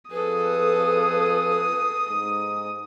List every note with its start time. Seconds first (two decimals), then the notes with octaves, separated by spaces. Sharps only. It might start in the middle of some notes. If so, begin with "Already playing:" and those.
0.11 F2 G#4 A4 B4 D#6
2.09 G#2